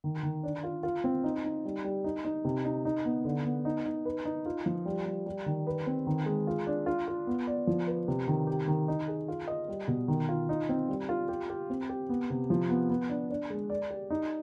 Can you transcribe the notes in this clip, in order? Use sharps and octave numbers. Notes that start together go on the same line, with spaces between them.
D#3
D#3
D4
F4
F4
C4
D#4
D#4
G3
G3
D#4
D#4
C3
D#4
D#4
B3
D3
B3
D#4
D#4
B4
D#4
F4
F3
G3
G3
G3
D#3
B4
C4
D#3
G#3
F4
D4
F4
F4
B3
D5
F3
B4
C3
D#3
G4
D#3
D#4
G#4
F4
D#5
G3
B2
D#3
F4
D#4
C4
G3
F4
G4
G4
C4
G4
B3
C3
F3
B3
B3
D4
D4
G#3
D5
G4
D#4